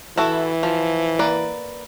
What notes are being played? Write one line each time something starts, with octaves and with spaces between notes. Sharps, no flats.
E3 E4 F#4 A4
F3
A#3 B4 D5